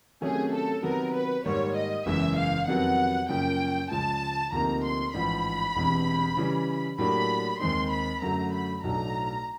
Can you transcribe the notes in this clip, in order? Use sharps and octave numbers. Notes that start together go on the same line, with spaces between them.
C3 D#3 F#3 A3 C#4 G#4
A4
C3 D#3 F#3 B3 A#4
B4
G#2 D#3 G3 A#3 C#5
D#5
F#1 E2 C#3 E3 G#3 E5
F5
F2 C3 D#3 F#3 B3 F#5
F#2 C#3 F3 A#3 G5
C#2 C#3 F3 G#3 A5
D2 C3 F3 A#3 D#4 A#5
C6
A1 G#2 F3 B5
E1 E2 C3
C#3 E3 G3
A2 F#3 A#3 D4 G4 B5
D#2 D#3 G#3 C4 D#4 C6
B5
F#2 D3 F#3 A3 A#5
B5
B1 A2 F#3 A3 D4 A#5